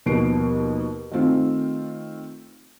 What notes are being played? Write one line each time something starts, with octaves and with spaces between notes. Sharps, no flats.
D#2 B2 F3 G3 C7 D7
D#3 A3 C4 F4